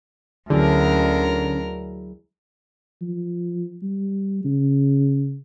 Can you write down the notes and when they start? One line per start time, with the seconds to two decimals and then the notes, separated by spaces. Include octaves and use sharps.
0.50 D2 D3 F#3 C#4 E4 G#4 A#4
3.02 F3
3.83 G3
4.44 C#3